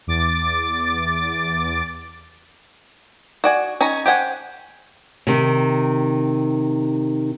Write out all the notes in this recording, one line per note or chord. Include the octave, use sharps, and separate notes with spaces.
E2 D6 A6
F#4 D5 G#5
C#4 D#4 C#5 A#5
G4 C5 F#5 G#5
C3 D#3